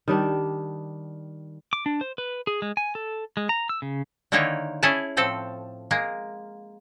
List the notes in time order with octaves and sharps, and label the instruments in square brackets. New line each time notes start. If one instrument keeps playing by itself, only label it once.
[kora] D#3 G3 D4
[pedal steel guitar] D6
D4
C5
B4
G#4
G#3
G#5
A4
G#3
A#5
E6
C#3
[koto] D3 D#3 A#3 D#4 E4 C#5
C#4 E4 G#4 G#5 A5
A2 F3 C4 A4
G#3 A#3